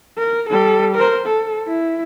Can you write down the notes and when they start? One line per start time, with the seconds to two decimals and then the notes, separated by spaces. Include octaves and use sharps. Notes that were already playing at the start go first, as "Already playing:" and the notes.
0.18 A#4
0.50 G3 A4
0.96 A#4 C5
1.27 A4
1.68 E4